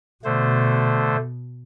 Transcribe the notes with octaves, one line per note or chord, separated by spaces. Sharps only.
B2 D3 A3 C5